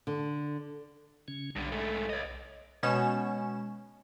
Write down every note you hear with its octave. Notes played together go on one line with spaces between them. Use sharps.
D3
C#3 C#4
B1 G2 D3
G#2 A3
C#5 D#5
B2 G#3 C#4 E7